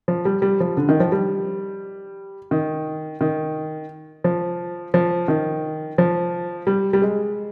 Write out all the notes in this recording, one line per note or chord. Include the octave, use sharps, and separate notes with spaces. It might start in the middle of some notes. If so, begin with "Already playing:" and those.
F3
G3
G3
F3
D3
D#3
F3
G3
D#3
D#3
F3
F3
D#3
F3
G3
G3
G#3